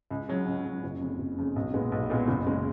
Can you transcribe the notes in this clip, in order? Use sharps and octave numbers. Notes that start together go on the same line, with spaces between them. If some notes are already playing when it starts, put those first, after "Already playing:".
C#2
C#3 F#3 C#4
C#2
C#3 F#3 C#4
F#1
F2 C#3
F#1
F2 C#3
B1
A#2 G#3 B3
B1
A#2 G#3 B3
F#1
C#3 G#3